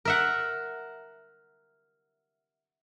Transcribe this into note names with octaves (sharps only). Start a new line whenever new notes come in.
A#4 E5 F#5